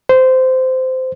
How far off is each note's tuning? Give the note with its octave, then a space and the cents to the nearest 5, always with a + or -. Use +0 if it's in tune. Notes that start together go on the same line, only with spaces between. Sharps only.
C5 -15